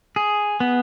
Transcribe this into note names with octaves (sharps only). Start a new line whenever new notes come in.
G#4
B3